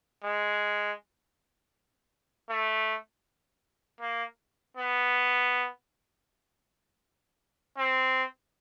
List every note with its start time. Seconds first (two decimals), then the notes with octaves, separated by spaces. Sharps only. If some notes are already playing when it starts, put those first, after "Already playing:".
0.24 G#3
2.49 A3
4.00 A#3
4.77 B3
7.78 C4